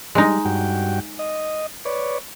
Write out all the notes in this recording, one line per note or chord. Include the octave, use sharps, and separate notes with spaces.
G3 G#3 D#4
G2 F#4 G5
D#5
B4 C#5 D5